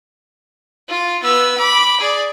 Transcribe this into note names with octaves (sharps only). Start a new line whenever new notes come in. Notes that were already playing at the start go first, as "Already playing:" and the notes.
F4
B3 E6
B5 D6
G#4 D5